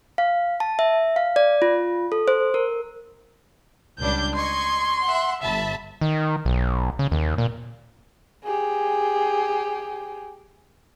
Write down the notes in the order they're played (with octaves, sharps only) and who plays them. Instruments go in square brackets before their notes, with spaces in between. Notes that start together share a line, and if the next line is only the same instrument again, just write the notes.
[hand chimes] F5
A5
E5
F5
D5
F4
A4
C5
A#4
[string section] C#2 G3 D4 [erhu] G6
[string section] D#5 C#6 G#6 [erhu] C6
[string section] E5 F#5
[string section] G1 A5 B5 [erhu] E5
[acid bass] D#3
B1
C#3
D#2
A#2
[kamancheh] G4 G#4